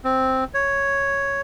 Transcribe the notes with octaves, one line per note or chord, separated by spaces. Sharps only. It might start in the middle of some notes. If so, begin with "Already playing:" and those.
C4
C#5